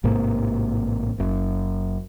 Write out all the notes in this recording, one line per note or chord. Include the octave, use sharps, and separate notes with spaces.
A1 G#2 C3 A#3
F#1 F#2